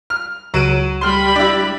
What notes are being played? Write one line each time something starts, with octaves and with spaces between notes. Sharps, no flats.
F6
C#2 F#3 D7 D#7
G3 B5 C6 F6
D4 E4